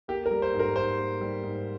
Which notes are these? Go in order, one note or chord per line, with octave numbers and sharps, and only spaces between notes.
A#3 G4
A#4
G3
C5
G#2
A#4
G#2 C5
A#3
G3
G#2